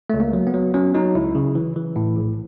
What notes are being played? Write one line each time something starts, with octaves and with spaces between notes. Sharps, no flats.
C#2 A3
A#3
F#3
B3
F#3
F#3 C#4
F#3 D#4
C#2 E4
C#3
E3
E3
A2
A#1